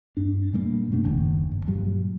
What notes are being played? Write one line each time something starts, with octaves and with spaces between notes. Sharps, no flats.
G2 D4
A#2 G3 A3 A#3
F#2 B2 A3 D4
F#1 D#2
G1
G2 A#2 F#3 G3